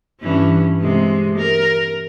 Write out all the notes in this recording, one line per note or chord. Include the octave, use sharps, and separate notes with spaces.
G2 E3 C#4
C3 G#3
A#4